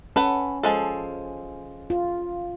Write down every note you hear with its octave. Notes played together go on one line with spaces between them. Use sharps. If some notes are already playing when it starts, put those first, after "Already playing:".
C#4 A4 B4 F#5
F3 G#3 A4
F4